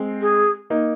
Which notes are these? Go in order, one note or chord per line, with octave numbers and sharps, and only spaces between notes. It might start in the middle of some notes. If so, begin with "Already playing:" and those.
Already playing: G#3 C4
G#4
A#3 D#4